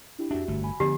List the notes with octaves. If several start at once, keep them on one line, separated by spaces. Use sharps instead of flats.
D4 E4 G4
F2 D4 F#4 G4 E5
G1 A3
G#5 B5
D3 F3 B3 G4